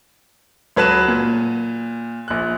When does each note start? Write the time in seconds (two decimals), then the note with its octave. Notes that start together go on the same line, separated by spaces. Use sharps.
0.76 C#2 F#3 B4 A5 F#6 E7
1.08 A#2
2.28 A#1 F#6